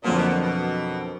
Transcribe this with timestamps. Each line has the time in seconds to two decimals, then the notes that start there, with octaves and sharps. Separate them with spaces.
0.04 F2 A#2 D3 F#3 A#3
0.17 B2
0.29 B2
0.42 B2